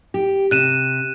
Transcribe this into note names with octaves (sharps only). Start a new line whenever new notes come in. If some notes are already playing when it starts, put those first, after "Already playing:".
G4
C3 F#6 D#7 E7